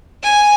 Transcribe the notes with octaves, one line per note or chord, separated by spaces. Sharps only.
G#5